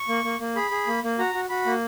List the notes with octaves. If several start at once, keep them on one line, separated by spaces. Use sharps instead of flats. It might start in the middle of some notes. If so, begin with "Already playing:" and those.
Already playing: C#6
A#3
A#3
A#3
G#4 B5
G#4
A#3
A#3
F#4 A#5
F#4
F#4 B5
A#3